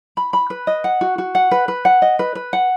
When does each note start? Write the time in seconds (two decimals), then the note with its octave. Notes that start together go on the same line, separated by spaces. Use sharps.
0.17 B5
0.33 B5
0.50 B4
0.67 D#5
0.84 F#5
1.01 F#4
1.18 F#4
1.35 F#5
1.51 B4
1.68 B4
1.85 F#5
2.02 D#5
2.19 B4
2.35 B4
2.53 F#5